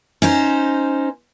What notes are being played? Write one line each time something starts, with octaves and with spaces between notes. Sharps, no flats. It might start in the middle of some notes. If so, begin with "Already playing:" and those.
C#4 D#4 C5